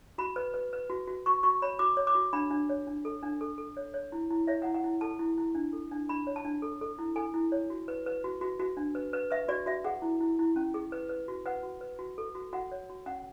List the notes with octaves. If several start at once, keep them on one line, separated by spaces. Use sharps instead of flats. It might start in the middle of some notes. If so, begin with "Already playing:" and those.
F#4 B5
B4
B4
B4
F#4
F#4
F#4 C#6
F#4 C#6
C#5 B5
F#4 D6
C#5
D6
F#4
D4 B5
D4
C#5
D4
A4
D4
A4
A4
C#5
C#5
E4
E4
C#5 E5
E4 F#5
F#5
E4
A4 A5
E4
E4
D4
A4
D4
D4 B5
C#5
A5
D4
A4
A4
E4
A4 G#5
E4
C#5
F#4
B4
B4
F#4
F#4
F#4
D4
B4
B4
B4 E5
F#4 D5
F#4 E5
G#4 F#5
E4
E4
E4
C#4
G#4
B4
B4
F#4
B4 F#5
F#4
B4
F#4
A4
F#4
F#4 F#5
C#5
F#4
C#4 F#5